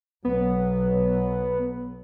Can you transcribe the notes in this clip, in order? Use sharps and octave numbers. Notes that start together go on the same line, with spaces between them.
B1 F#3 B3